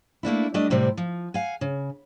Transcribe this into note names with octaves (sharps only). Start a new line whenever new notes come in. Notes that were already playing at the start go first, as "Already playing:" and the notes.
A3 A#3 D4 E4
G3 A3 D4 D#5
A2 C3 G3 C4 E4
F3
F5 F#5 G#5
C#3